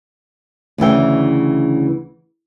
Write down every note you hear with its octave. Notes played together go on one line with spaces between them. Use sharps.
D2 C#3 E3 G5